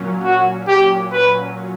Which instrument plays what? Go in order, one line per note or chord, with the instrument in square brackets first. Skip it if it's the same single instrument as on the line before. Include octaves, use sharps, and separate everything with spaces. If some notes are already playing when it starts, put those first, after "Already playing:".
Already playing: [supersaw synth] A#2 F#3 C#4
[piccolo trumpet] F#4
G4
B4